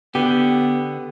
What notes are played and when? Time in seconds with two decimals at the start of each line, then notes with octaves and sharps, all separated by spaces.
0.15 D3 B3 G4